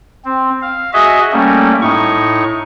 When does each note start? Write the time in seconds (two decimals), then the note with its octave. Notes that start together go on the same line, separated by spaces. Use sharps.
0.25 C4
0.62 F5
0.93 F#4 G#4 D#5 E5
1.32 G3 A3 A#3 C#4
1.82 A2 D#4 C#6